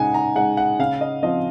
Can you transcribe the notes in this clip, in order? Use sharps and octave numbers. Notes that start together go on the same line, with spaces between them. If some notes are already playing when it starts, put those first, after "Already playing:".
Already playing: C#3 G#3 D#4 F#5 G#5
A#5
G#3 D#4 F#5
F#5
C#3 F5
D#5
F3 C4 F4 D#5